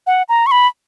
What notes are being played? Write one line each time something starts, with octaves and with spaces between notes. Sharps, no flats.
F#5
A#5
C#6
B5